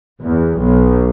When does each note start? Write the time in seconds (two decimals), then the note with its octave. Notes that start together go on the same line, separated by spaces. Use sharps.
0.20 E2
0.56 B1